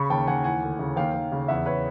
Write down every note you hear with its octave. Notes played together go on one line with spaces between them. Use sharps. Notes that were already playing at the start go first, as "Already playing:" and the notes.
Already playing: C#3 B5 C#6
D#2 G5 A5
D#2 F#5 G#5
E3 F#5 G#5
D2
C#3
D#2 F5 G5
D#2
C#3
E2 E5 F#5
B4 C#5